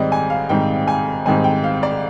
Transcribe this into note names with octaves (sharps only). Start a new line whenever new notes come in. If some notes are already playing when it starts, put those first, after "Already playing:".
Already playing: G#2 D#3 G3 C4 D5 D#5
G#5
F5
G#2 D#3 G3 C4 G5
G#5
G#2 D#3 G3 C4 G#5
G5
F5
D5